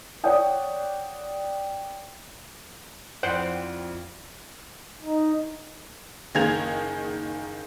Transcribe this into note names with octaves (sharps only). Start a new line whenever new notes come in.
C#5 D5 F#5 G5 D#6
F2 E4 C5 D5 F#5 G5
D#4
F#1 D#3 A#3 G#4 G#6 F7